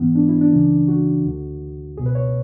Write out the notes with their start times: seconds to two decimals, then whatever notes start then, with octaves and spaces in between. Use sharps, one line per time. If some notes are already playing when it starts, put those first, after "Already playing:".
Already playing: G#2 E3 B3
0.15 D4
0.29 E4
0.41 D4
0.52 C#2 C#3 E3
0.88 F#4
1.25 D2 D3
1.97 C#2 B2 G#4
2.06 B4
2.15 C#5